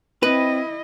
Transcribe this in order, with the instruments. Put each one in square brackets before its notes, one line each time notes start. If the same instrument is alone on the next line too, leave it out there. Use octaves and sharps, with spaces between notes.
[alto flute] C4 [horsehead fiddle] E4 D#5 [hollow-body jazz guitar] B4